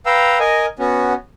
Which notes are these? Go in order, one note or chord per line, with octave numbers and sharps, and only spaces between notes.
B4 F5 G5 A#5 E6
A#4 D#5 G#5
B3 C#4 F#4